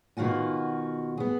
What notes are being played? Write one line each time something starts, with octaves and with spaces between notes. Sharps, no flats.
B2 D#3 F4 F#4 G#5
B3 G#4